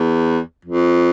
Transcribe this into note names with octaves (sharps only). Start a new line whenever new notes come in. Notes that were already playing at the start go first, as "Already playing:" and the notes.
Already playing: E2
F2